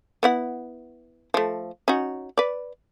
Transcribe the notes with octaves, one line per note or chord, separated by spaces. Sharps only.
B3 E4 F#5
F3 A3
C#4 D#4 F#4
B4 D5